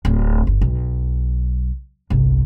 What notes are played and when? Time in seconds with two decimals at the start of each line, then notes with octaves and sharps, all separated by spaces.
0.05 D1
0.47 G1
0.61 B1
2.10 G1 C2